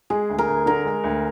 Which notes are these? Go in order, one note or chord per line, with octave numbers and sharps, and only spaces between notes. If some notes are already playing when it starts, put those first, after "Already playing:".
G#3 G#4
D2
A#4
D2
D3 A#4
G#3
D2